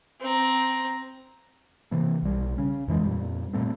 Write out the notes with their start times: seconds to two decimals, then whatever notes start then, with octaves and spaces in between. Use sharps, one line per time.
0.20 C4 A#5
1.91 C3 E3 A#3
2.22 B1 G3
2.58 C#3 C#4
2.88 F2 E3 G#3
3.04 F2 A#2 G3
3.53 A#2 G3 A3 C4